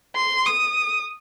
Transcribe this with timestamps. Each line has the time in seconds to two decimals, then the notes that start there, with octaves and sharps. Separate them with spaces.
0.16 C6
0.46 D#6